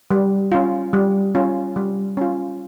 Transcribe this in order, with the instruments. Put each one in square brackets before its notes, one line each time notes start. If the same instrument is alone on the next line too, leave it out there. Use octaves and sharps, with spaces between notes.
[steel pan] G3
C#4 F4
G3
C#4 F4
G3
C#4 F4